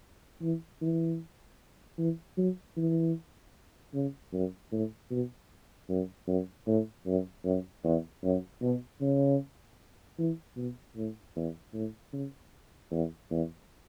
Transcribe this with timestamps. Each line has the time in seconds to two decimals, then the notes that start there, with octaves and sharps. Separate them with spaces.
0.42 E3
0.82 E3
1.99 E3
2.38 F#3
2.77 E3
3.94 C#3
4.33 F#2
4.72 A2
5.11 B2
5.89 F#2
6.28 F#2
6.67 A2
7.07 F#2
7.45 F#2
7.84 E2
8.24 F#2
8.62 B2
9.01 C#3
10.19 E3
10.57 B2
10.96 A2
11.36 E2
11.74 A2
12.13 C#3
12.91 E2
13.31 E2